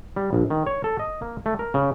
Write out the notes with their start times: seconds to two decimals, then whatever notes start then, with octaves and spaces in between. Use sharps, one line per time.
0.16 G3
0.33 A#1
0.50 D#3
0.66 C#5
0.84 A4
0.99 D#5
1.22 A#3
1.46 A3
1.59 A#4
1.74 C#3